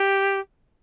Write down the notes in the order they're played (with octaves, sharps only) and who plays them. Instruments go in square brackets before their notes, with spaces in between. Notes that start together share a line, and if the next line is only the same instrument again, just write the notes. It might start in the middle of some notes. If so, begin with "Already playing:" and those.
Already playing: [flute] G4